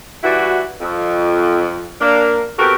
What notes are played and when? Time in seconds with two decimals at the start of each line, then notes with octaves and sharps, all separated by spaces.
0.24 E3 G3 E4 F#4
0.81 F2
2.01 A#3 D4
2.59 B3 C4 F#4 G4 A4 A#4